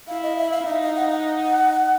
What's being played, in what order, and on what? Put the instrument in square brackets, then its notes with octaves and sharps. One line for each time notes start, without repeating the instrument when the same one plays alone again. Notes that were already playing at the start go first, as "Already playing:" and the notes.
[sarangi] E4 [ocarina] F5
[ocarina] D#5
E5
F5
[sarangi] D#4 [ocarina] E5
[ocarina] F5
F#5
F#5